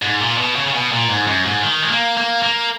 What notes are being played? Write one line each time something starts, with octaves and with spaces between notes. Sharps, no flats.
G#2
A#2
B2
C#3
C#3
B2
A#2
G#2
F#2
G#2
D#3
G#3
A#3
A#3
A#3